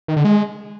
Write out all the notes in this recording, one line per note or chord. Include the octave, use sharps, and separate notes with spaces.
D#3
D3
G#3